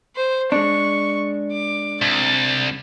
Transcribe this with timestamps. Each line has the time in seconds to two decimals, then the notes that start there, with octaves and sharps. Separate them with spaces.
0.16 C5
0.52 G#3 D4 C#6
1.52 D6
2.02 C2 A6